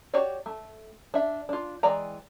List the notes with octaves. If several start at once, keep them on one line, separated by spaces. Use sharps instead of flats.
F#4 G4 C#5 D5
A3
D4 E5
D4 F4
E3 G#3 D5 G5 A#5